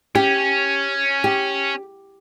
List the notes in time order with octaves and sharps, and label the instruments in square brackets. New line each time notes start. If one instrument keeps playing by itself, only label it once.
[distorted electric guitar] C#4 [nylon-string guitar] G4
[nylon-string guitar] G4